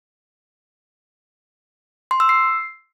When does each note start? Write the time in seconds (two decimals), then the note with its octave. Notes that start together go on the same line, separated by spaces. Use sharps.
2.11 C6
2.20 E6
2.29 C7